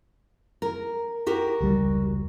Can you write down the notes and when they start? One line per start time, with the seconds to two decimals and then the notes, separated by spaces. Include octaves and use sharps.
0.62 A#4
1.26 F#4 G4 A#4
1.60 F1 C#2 G3